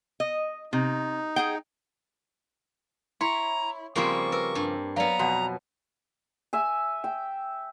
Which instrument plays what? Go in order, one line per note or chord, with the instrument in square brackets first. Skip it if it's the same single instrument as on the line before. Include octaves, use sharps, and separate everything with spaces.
[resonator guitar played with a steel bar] D#5
[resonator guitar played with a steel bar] C3 [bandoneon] D#4
[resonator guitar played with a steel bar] G#4 F#5 G5
[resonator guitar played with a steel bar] E4 [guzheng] C#5 [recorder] A#5 [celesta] C6
[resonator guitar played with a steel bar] C#3 F3 G3 [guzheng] A#3 C4 [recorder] C#6
[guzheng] A#4 [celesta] B4 E6
[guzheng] G2
[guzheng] F#3 B3 [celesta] B4 D5 F5 [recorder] A#5
[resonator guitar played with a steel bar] F2 B2
[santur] E5 G#5
G5